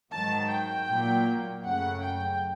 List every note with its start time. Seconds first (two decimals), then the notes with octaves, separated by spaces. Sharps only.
0.12 G#2 D#3 F#3 A5
0.50 G5
0.88 A#2 F#3 A#3
1.64 F#2 C#3 F#3 A3 F#5
2.02 G5